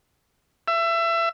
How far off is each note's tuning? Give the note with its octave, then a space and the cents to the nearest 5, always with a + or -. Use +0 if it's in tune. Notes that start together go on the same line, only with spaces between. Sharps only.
E5 +25